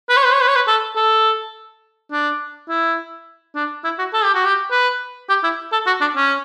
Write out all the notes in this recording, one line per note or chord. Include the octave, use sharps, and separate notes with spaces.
B4
C#5
B4
C#5
B4
C#5
B4
A4
A4
D4
E4
D4
E4
F#4
A4
G4
F#4
G4
B4
G4
E4
A4
F#4
D4
C#4